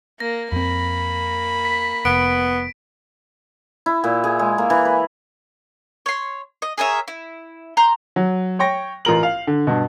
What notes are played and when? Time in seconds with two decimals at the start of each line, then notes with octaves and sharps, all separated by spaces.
0.20 A#3 A#6
0.52 F2 A#3 C4 B5
1.65 B6
2.05 F1 B3 D7
3.86 E4
4.04 A#2
4.24 G#4
4.39 G#3
4.58 A#3
4.70 E3
4.85 B4
6.06 C#5 C6
6.62 D#5
6.78 G#4 A#4 C#5 E5
7.08 E4
7.77 A#5 C6 G6
8.16 F#3
8.59 C#5 G5 C#6 A#6
9.05 A1 F4 A#4 F#7
9.23 F5
9.47 D3
9.67 G2 B2